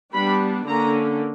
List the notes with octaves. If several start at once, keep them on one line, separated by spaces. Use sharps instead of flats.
G3 B3 D4 B5
D3 A#3 C#4 A#5